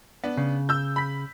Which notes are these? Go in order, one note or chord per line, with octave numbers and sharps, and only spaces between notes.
B3 D4
C#3
E6 G6
B5 B6